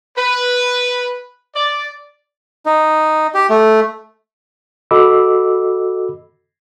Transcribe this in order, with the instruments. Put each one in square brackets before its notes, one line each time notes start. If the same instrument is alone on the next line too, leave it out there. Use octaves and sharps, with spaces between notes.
[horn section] B4
D5
[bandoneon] D#4
G4
A3
[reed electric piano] F#4 A4 D#5 B5 D6 E6